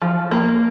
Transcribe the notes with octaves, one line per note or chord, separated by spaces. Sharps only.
F3
A#3